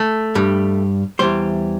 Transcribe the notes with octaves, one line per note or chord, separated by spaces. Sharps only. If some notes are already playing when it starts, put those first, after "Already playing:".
Already playing: A3
G2 G3
E2 E3 G3 C5